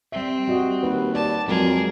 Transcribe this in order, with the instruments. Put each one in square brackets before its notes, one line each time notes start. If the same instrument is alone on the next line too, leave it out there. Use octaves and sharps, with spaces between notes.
[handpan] G3 E5 [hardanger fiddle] C4
[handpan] G3 F#4 D#5
[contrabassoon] D#2 [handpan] B4
[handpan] D5 [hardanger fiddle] A5
[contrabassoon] F2 [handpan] F#3 G#3 [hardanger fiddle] G#4 A#4